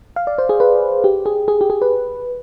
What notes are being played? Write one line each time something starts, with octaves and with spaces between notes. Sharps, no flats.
F5
D5
C5
G#4
B4
G4
G#4
G#4
G4
G#4
B4